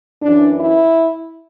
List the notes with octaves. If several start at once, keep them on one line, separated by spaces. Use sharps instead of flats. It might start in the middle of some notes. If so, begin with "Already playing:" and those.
F#2 E3 D4
E4